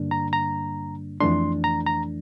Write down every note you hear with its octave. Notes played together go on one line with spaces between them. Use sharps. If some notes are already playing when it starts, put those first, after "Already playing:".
Already playing: G2 D3 G3 A#3 D4
A#5
A#5
F2 E3 A3 D4 C6
A#5
A#5